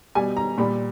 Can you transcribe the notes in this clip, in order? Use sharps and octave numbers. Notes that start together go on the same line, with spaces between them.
B2 G3 G#5
A#5
A#2 G3 B5